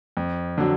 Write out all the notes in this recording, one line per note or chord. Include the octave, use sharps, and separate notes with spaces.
F2
D3 F#3